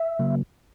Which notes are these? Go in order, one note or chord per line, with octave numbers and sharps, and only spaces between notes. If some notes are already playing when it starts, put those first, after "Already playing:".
Already playing: E5
C#3 F#3 A#3